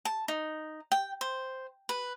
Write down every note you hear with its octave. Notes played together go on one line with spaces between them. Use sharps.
A5
D#4
G5
C5
B4